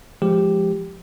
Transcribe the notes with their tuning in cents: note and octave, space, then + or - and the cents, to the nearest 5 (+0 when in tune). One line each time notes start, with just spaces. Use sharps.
F3 +0 G#3 +5 G4 +0